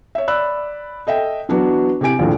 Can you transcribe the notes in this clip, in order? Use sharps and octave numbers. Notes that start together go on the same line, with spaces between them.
C#5 E5
D5 B5 E6 F#6
A4 D#5 E5 G5
E3 F#3 B3 D4 F#4
C3 E4 G4 G#5 D7
A#1 D#2 A2 D3